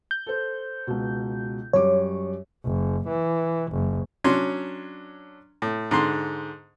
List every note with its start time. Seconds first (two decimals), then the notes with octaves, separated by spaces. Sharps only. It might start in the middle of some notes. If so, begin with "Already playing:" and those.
0.11 G6
0.26 A4 C5
0.87 C#2 B2
1.73 F#2 G3 C#5 D6
2.65 F#1
3.08 E3
3.72 F#1
4.24 F#3 C#4 D4 C6
5.62 A2
5.91 G#2 D3 C6